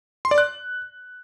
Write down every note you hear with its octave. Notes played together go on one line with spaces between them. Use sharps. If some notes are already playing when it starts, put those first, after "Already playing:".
C6
D5
F#6